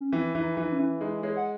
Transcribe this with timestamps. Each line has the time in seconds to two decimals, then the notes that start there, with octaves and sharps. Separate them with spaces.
0.01 C#4
0.13 E3 C4
0.35 E3
0.42 D#4
0.57 E3
0.63 D#4
0.72 C#4
0.79 E3
1.01 G#3 D#4
1.23 G#3 C#5
1.37 F#5